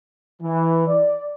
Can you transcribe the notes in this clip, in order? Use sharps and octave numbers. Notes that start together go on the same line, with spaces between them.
E3
D5